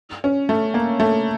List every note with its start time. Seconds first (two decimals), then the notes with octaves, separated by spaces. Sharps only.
0.24 C#4
0.49 A3
0.74 A#3
1.00 A3